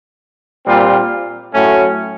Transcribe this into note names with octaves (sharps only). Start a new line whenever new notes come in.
A#2 G3 C4 F4
A2 F#3 A3 C#4